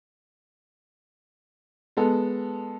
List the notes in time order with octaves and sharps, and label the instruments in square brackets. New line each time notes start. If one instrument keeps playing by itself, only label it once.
[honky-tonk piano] G#3 B3 A4